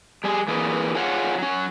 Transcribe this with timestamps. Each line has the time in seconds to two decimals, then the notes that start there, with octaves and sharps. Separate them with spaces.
0.24 G3 G#4
0.48 E3 A#3 G#4 B4
0.95 F4 G#4 C#5 F5 F#5
1.38 F#3 C#4